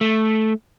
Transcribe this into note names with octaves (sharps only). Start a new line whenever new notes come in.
A3